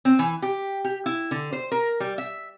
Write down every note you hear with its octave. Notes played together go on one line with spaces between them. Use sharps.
C4
E3
G4
G4
E4
D3
C5
A#4
G3
E5